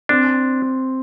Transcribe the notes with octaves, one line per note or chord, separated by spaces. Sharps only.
C4 D4